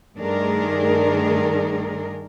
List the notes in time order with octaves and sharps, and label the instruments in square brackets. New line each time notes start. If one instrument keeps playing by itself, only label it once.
[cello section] G2 D#3 A3 D4 G#4 A#4